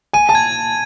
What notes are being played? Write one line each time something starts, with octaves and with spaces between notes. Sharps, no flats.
G#5 D#7
A5
G#6